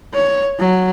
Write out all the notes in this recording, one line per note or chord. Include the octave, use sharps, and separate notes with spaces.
C#5
F#3